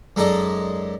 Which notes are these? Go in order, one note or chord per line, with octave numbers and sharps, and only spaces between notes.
F#2 G#3 D#4 A4 D5